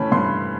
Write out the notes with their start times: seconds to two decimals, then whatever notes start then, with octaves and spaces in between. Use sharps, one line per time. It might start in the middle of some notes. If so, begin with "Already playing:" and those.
Already playing: E3 A3 C#4 B5
0.12 G2 C6